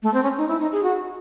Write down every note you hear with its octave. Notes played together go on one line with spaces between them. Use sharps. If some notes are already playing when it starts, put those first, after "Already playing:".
A3
C4
C#4
D#4
E4
D#4
G#4
F#4